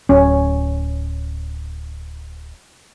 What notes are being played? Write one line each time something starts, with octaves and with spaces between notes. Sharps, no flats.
D1 C#4